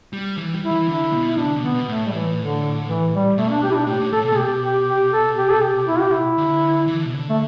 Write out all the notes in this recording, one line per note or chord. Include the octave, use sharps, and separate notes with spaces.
G3
E3
G3
E4
E3
D3 E4
D3
B2
E4
B2 D4
D3
B2
D3 B3
B2
A2 A3
G3
E3
D3
E3
G3
B2 A3
D4
G4
E4
D4
A2 G4
A2
A2 A4
B2
A4
A2
B2 G4
G4
G4
A4
G4
A4
G4
E4
G4
E4
D3
E3
D3
B2
D3
A3